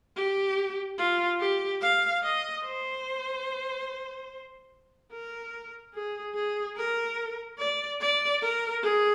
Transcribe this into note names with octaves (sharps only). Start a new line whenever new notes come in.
G4
F4
G4
F5
D#5
C5
A#4
G#4
G#4
A#4
D5
D5
A#4
G#4